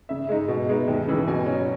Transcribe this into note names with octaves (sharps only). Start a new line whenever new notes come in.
C#3 E5
G#3 D#4
B2
G#3 B3 D#4
D#2
C#3 E3 G#3
B2 G#5
F#3 C#4